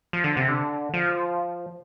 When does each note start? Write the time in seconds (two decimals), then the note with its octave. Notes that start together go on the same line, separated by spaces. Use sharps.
0.13 F3
0.24 D3
0.37 C3
0.48 D3
0.94 F3